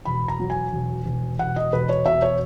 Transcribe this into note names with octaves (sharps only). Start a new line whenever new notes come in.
E1 B5
A#5
F#3
G#5
E1
E1
E1 F#5
D#5
E1 B4
C#5
B2 E5
C#5